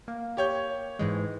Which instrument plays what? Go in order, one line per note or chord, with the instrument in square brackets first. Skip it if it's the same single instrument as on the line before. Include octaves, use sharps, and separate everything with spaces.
[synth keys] A#3
[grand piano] G4 C#5 G6
[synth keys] G#2 E3 G#3